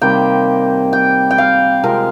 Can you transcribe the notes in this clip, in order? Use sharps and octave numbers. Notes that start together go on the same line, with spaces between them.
C3 D#3 G3 A#3 G5
G5
G5
F5
C3 F3 G#3 A#4